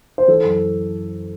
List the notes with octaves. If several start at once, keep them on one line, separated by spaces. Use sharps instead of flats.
C5
E3 A4
F#2